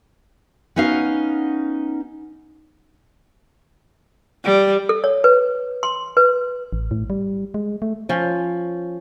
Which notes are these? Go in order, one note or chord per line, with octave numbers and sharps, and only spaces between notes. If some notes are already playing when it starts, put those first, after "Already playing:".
B3 C#4 D#4 F#4 F5
G3
A4
C#5
B4
C6
B4
A1
A2
G3
G#3
A3
F3 C#4